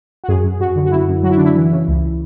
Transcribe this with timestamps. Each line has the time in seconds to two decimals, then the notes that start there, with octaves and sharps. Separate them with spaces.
0.24 F#4
0.28 F#2 G#4
0.44 F#2
0.60 F#2 F#4
0.76 D3
0.85 F#4
0.91 F#2 E4
1.08 F#2
1.23 F#3 F#4
1.31 E4
1.37 D3 D4
1.45 E4
1.56 E3
1.72 C#3
1.88 C#2